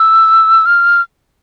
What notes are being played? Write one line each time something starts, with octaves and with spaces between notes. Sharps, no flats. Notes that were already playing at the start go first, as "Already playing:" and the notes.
Already playing: E6
F6